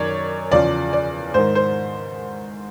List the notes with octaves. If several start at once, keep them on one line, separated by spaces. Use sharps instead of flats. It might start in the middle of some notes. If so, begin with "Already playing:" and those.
Already playing: F#2 D#3 C#5 D5
E2 C#3 F3 D5
D5
G#2 D#3 C5
C5